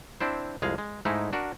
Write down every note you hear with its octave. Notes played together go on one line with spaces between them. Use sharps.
C4 D4 E4 C5
C2 F2 G#3 G#4 F5
G#3
G#2 G#3 A3 D#4 E4
D4 F#4 A#4